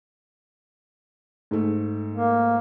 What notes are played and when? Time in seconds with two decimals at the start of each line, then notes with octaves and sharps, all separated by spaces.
1.51 G#2 A3
2.13 A#3